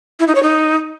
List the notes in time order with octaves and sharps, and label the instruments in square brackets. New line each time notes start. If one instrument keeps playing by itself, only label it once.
[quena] E4
D#4
C#5
D#4